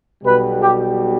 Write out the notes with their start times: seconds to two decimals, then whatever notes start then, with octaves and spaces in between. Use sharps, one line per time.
0.23 B1 B2 G3 B4
0.60 G4